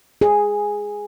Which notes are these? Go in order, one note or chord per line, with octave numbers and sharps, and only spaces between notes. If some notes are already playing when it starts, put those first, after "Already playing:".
G#4